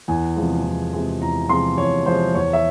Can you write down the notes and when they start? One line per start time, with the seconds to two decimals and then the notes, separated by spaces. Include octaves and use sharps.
0.08 E2 G#5
0.36 C3 F3 G#3
0.64 E2
0.93 C3 F3 G#3
1.21 E2 A#5
1.49 C3 F3 G#3 C6
1.77 E2 C#5
2.06 C3 F3 G#3 C5
2.34 E2 C#5
2.53 E5